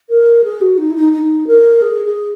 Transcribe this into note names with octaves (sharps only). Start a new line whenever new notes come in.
A#4
G#4
F#4
D#4
E4
D#4
D#4
A#4
G#4
G#4